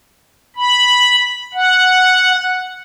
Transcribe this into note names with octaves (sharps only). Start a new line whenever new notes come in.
B5
F#5